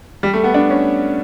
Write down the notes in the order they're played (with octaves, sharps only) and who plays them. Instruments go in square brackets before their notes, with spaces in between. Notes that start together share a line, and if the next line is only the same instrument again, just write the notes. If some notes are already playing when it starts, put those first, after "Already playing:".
[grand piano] G3
A3
B3
D4
C#4